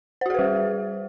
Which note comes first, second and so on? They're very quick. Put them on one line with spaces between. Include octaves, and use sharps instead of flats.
C5 F#4 G#4 B4 G3